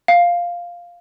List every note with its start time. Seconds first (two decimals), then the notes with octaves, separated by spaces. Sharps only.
0.08 F5